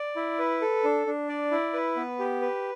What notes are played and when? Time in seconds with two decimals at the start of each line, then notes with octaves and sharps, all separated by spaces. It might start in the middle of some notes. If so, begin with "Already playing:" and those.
Already playing: D5
0.16 E4
0.39 B4
0.61 A4
0.84 D4
1.07 D4
1.29 D5
1.51 E4
1.73 B4
1.96 B3
2.19 G4
2.42 B4